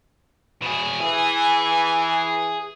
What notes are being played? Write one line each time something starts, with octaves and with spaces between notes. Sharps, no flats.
B2 G#4
E3 G#4